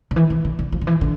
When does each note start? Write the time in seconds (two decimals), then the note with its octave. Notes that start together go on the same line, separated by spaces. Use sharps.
0.11 D3
0.16 E3
0.30 E3
0.45 D3
0.59 D3
0.72 F3
0.81 D3
0.87 E3
1.01 D3